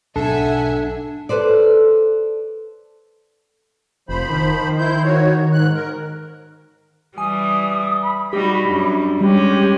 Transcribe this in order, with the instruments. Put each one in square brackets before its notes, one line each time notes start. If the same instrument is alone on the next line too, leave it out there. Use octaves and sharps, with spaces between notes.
[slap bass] B1 G#2 [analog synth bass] D4 [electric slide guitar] A4 [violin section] E5 F#5 G#5
[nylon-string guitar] A4 B4 C5 D5
[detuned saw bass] F1 [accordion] F3 C5 B5
[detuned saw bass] D#3
[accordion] E4 C5 G6
F#4 C#5
G#2 F#6
A#4
[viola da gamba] E3 G3 [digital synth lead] G#5 [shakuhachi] D#6
[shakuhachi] B5
[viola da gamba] G3 D#4 F#4 [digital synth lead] G4
[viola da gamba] F#2 G3 [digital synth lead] D4
[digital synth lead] G3 [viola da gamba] G#3 C#4 [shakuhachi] G4